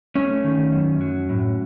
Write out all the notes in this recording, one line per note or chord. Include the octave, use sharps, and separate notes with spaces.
A3 C#4
D#3
F#2
F#3
A2